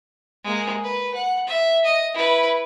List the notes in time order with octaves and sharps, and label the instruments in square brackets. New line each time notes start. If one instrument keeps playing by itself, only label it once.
[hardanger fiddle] G#3 A#3
B4
F#5
E5
D#5
E4 B4